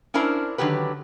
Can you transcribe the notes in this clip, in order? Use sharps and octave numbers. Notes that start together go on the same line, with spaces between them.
C#4 D4 E4 A#4 C5
D3 D#3 F#3 G4 B4